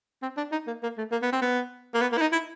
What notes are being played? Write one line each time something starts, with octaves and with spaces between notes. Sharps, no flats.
C4
D4
D#4
A#3
A#3
A3
A#3
B3
C4
B3
A#3
B3
A#3
E4
D#4
E4